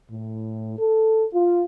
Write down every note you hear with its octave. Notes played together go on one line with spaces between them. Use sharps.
A2
A4
F4